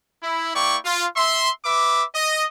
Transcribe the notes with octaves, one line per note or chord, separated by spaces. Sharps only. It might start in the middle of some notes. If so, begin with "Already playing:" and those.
E4
A#3 E4 D5 G5 C#6
F4
E5 C6
B4 E5 D6
D#5